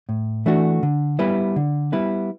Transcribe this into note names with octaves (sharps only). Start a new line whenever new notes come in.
A2
E3 A3 D4 F#4
D3
G3 B3 E4 B4
D3
G3 B3 E4 B4